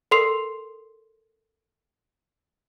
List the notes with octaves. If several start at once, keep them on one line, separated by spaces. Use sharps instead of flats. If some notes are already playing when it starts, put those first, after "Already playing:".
A4 A#4 C6 C7 F7